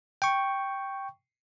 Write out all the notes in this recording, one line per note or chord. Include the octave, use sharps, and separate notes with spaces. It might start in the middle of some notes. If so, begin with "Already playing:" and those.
G5 C#6